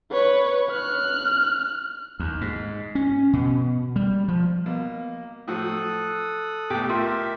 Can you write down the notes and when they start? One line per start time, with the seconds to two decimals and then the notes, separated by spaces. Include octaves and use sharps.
0.12 B4 C#5
0.70 F6 F#6
2.20 D#2
2.41 G#2
2.95 C#4
3.33 B2
3.96 G3
4.28 F3
4.66 B2 A#3
5.48 A2 F3 F#3 A4 D#6 F#6
6.70 B1 A2 G4
6.89 F4 G4 A#4 E5